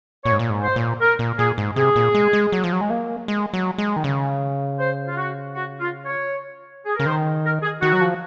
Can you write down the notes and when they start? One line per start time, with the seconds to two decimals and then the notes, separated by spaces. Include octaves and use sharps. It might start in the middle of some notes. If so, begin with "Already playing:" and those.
0.25 A#2 C#5
0.32 G#2
0.39 A#2
0.50 G#2
0.63 C5
0.76 A#2
1.01 A#4
1.19 A#2
1.38 A#2 G#4
1.58 G#2
1.76 C3 G#4
1.96 A#2
2.14 G#3
2.33 G#3
2.52 F#3
2.64 F3
2.73 F#3
2.81 G#3
2.90 A#3
3.28 G#3
3.53 F#3
3.78 G#3
3.96 D#3
4.04 C#3
4.79 C5
5.07 F4
5.17 F#4
5.54 F#4
5.80 F4
6.06 C#5
6.86 G#4
6.96 C#3 A#4
7.06 D#3 C5
7.44 A#4
7.63 G#4
7.82 D#3 F#4
7.93 F#3
8.01 F3